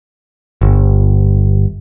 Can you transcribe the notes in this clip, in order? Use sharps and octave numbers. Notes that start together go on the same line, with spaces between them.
G1